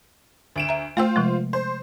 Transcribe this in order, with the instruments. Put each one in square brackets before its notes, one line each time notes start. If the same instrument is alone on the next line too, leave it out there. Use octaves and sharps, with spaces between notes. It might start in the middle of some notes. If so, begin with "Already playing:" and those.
[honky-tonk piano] D2 D7 E7
[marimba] E5 A#5
[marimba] A3 G5 E6 [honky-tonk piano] F4 C5
[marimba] C3 F3 G#3
[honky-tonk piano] C5